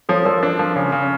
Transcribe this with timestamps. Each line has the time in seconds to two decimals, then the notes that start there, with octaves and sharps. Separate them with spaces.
0.09 F3 A4 C#5
0.25 F3 A#4 D5
0.42 D4 A#4 D5
0.59 F3 A#4
0.76 C#3
0.92 C#3